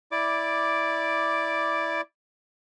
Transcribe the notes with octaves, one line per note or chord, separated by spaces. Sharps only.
E4 D5 D6